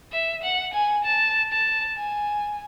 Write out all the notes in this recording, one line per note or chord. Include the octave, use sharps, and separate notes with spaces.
E5
F#5
G#5
A5
A5
G#5